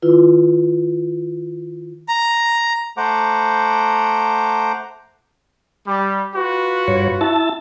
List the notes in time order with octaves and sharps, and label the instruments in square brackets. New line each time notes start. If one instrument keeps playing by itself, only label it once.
[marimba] D#3 E4 F4 B4
[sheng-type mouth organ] A#5
[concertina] A3 C5 F#5 A#5 D6
[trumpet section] G3
F4 F#4 B4
[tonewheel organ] G2 C#5
E4 A5